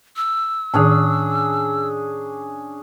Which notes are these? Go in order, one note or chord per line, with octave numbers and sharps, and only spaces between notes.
E6
A2 D#3 C#4 D4 G#4